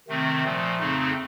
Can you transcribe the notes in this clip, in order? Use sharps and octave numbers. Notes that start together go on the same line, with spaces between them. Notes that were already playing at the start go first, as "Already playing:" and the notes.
C3 D#3 A3 C4
A#2 F3 A3
F2 C#3 A3 C4 D#4